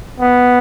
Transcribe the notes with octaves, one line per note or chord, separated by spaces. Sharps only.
B3